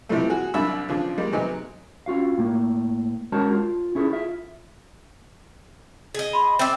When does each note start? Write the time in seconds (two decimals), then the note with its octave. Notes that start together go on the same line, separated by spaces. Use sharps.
0.09 C3 E3 F3 G3 A3
0.29 F#4 G#4
0.54 C2 F#2 D4 E5 B5 E6
0.89 C#3 F3 D4
1.18 G3 G#3 A#3
1.33 C3 F#3 B3 C4 D#4 G#4
2.06 C#4 F4 F#4 F5
2.38 A2 A#3
3.32 G#3 C#4 F#4 A#4 C#5 A5
3.52 F4
3.95 C#4 E4 G#4 A4
4.12 F4 E5
6.15 G#4 D#5
6.33 B5 C6
6.59 C4 D5 E5 E6